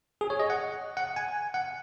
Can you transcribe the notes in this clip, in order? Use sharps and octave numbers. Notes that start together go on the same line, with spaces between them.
G#4
C#5
D#5
F#5
F#5
G#5
F#5